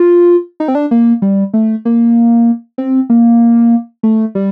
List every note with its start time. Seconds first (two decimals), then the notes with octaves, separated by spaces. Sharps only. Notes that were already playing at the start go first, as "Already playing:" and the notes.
Already playing: F4
0.60 D#4
0.68 C4
0.75 D4
0.91 A#3
1.22 G3
1.54 A3
1.85 A#3
2.78 C4
3.10 A#3
4.03 A3
4.35 G3